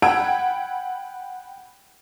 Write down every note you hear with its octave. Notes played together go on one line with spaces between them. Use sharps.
F#5 G5 B5 E6 G#6 D7